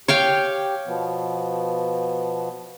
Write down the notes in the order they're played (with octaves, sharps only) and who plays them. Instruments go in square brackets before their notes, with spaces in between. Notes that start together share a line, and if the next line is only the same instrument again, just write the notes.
[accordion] G4 [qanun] C#5 F5 G5
[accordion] B2 F3 B3